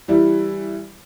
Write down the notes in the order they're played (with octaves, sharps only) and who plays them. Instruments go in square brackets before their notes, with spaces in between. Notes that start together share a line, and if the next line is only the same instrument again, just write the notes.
[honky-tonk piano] E3 G3 E4